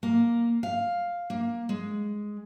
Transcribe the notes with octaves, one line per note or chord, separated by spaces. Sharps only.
A#3
F5
A#3
G#3